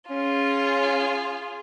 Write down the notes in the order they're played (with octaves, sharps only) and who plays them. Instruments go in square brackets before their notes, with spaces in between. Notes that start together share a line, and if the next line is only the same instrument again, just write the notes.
[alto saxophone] C#4 [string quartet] F4 G#4